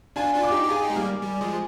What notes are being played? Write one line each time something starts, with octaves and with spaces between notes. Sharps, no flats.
D4 F4 G#5
D4 F4
D6
D#4 G4
G4
F4 G#4 G#5
D#4 G4
G#3
G3 A#3
G3
F3 G#3